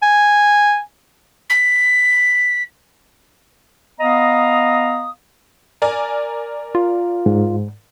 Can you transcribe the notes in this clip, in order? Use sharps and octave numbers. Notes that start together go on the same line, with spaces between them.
G#5
B6
B3 D#5 F5 A#5 D#6
A#4 D5 G#5
F4
G#2